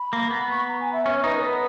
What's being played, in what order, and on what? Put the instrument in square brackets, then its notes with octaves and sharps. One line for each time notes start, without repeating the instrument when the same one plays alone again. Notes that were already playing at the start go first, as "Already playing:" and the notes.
Already playing: [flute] B5
[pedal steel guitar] A#3
B3
[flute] C#6
B5
A#5
G#5
E5
[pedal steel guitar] C#4 [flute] C#5
[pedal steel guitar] D#4 [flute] B4
[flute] A#4
[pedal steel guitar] B3 [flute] B4